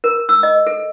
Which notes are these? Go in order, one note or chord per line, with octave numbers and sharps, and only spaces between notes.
A#4
E6
D#5
A4